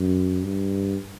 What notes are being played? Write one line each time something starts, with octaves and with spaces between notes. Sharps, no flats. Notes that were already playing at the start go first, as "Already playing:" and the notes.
Already playing: F#2
G2